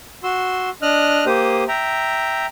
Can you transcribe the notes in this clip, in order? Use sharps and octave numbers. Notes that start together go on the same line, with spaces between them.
F#4 C6 E6
D4 D#5 F6 F#6
A#3 G4 C5 D#6
E5 G5 A#5